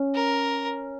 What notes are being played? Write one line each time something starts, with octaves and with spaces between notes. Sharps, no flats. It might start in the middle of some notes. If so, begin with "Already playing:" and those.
Already playing: C#4
A#4